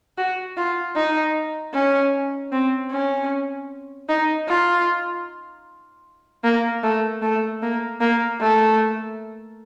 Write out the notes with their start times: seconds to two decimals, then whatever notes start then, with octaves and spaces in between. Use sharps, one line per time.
0.17 F#4
0.57 F4
0.96 D#4
1.74 C#4
2.52 C4
2.91 C#4
4.09 D#4
4.48 F4
6.44 A#3
6.83 A3
7.22 A3
7.62 A#3
8.01 A#3
8.41 A3